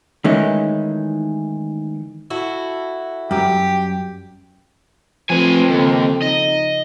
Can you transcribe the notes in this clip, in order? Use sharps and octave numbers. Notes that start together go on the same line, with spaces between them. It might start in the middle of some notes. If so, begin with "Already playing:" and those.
D#3 E3 G#3 A3 C#4 D#4
E4 F#4 A4
F#2 G3 G4
F3 A3 C4 B4 G#5
D#2 C#3 A4
D#4 D#5